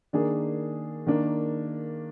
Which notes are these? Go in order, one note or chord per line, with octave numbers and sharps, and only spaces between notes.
D#3 A#3 D4 G#4
D#3 A#3 D4